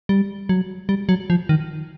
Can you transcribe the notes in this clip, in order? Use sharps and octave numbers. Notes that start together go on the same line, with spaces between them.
G3
F#3
G3
F#3
F3
D#3